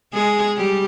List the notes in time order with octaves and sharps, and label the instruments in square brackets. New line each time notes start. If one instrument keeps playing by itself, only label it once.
[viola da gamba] G#3 G#4
G3 G4